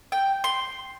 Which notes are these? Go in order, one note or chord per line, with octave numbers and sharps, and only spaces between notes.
G5
C6